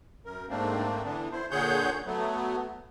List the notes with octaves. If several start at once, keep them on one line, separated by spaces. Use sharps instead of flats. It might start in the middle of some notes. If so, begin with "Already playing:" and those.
F#2 A#4
G#2 A3 A#3 C4 D4
D3 E3 B3 D4
E4 C5
A#2 D3 G#4 C#5 F#5 G6
F#3 A3 B3